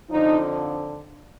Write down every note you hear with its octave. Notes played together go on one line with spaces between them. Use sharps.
F2 D3 F3 D#4